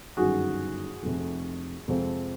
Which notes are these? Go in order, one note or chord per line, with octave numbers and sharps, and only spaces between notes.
G1 F#2 D#3 F#4 G#4
F1 F2 C3
F2 C3 F3 G#3 C4